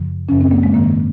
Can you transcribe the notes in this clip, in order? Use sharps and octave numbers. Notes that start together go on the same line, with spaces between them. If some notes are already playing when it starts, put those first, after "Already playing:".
Already playing: F#2 C#3 F3
F#2 C#3 F3 C#4
C4
A#3
G#3
G#2 D#3 A#3